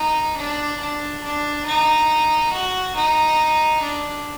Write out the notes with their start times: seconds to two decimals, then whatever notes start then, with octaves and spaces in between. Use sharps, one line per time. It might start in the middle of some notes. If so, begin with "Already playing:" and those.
Already playing: D#4
0.37 D4
0.80 D4
1.24 D4
1.66 D#4
2.53 F#4
2.96 D#4
3.82 D4